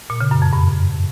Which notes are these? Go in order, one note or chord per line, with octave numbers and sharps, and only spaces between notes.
A#2
C#3
F#2
F2
G2